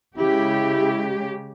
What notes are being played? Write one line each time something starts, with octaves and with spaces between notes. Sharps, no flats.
C#3 G#3 E4 G4